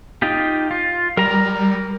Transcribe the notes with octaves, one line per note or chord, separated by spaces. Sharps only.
D#4 F4 G4
F4
G3 A#4 A#5